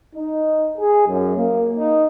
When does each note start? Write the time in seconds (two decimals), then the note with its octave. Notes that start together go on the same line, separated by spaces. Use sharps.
0.14 D#4
0.78 G#4
1.07 F#2
1.37 A#3
1.76 D#4